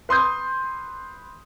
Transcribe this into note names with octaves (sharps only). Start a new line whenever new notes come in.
B4 C6 D#6 G6